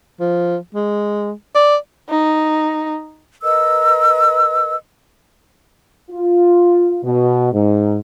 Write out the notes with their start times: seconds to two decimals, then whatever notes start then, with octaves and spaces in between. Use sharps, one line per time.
0.20 F3
0.75 G#3
1.55 D5
2.10 D#4
3.42 A#4 B4 D#5 E6
6.11 F4
7.04 B2
7.53 G#2